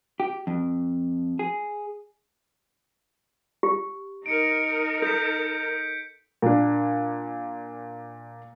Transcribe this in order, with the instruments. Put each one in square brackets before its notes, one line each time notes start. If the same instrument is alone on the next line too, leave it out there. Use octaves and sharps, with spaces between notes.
[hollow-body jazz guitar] G4
F2
G#4
[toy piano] G4
[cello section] D#4 A#4 [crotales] C#7 D7
[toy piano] A4 [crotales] G6 B6
[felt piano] A#2 D4